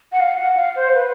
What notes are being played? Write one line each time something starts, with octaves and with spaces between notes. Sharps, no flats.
F#5
F5
F#5
F5
C5
B4